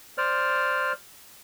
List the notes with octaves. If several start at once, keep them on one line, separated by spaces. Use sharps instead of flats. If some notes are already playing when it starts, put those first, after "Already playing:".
C5 D5 F6